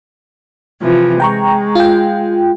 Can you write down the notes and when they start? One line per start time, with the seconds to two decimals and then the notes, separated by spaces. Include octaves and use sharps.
0.81 C3 E3 F3
1.20 G#3 G5 A#5 C#6
1.75 F4 G5